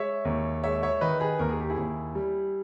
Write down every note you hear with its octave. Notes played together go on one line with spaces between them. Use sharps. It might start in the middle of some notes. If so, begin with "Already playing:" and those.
Already playing: G#3 C#5 E5
D#2
G#3 C#5 E5
C#5 E5
D#3 B4 D#5
G#4 B4
D#2 A#4
G#4
G4
E4 G#4
D#2
G3